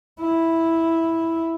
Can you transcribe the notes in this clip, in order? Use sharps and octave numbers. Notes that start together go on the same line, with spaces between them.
E4